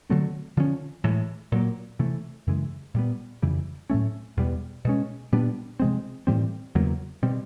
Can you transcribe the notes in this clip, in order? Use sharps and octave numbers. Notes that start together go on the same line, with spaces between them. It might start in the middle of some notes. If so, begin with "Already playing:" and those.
D3 F#3 A3 C4
D3 F3 G#3 C#4
A2 E3 G#3
A#2 F#3 A#3
C3 E3 A3
F#2 C#3 E3 G#3
A#2 G3 B3
F2 C#3 E3 G3
A2 F#3 A3 C#4
E2 B2 G3 B3
B2 G#3 C#4
A#2 G3 B3 D4
C3 F3 G#3 C4
A2 E3 G3 C4
E2 C#3 F#3 A#3
B2 G3 C4